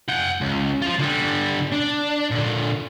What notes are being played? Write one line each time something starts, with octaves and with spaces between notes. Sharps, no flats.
F#5 G5
C#2
F4 C5
D3 G3
D4
A#2 D3